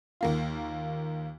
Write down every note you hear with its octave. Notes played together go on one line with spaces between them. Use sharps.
D#2 A#3 F4